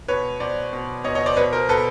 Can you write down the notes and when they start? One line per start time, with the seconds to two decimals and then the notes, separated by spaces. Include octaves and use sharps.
0.08 B2 B4 C#5
0.40 B2 C5 D5
0.73 B2
1.04 B2 C#5 D#5
1.15 C#5 D#5
1.26 C5 D5
1.36 B2 B4 C#5
1.53 A#4 C5
1.69 B2 A4 B4